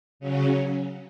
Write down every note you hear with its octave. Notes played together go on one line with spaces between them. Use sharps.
C#3 F#3 C#4